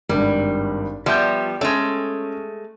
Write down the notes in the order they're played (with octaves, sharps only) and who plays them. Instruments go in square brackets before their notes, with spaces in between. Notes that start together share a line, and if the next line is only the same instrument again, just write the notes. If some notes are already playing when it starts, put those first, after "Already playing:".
[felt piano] G#1 G2 [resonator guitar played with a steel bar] G3
[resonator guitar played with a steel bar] F3 G3 B3 [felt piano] E5 G6
[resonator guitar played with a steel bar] G#3 A3 [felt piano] C#4